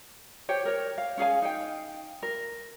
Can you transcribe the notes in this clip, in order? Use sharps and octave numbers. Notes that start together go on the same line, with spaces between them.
G4 C5 C#5 G5
A#4 C#5
F5
C#4 G#4 F5 G#5
D#4 G5
A#4